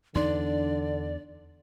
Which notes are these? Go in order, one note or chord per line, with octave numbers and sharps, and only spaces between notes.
E2 D3 D4 D#4 D5 C6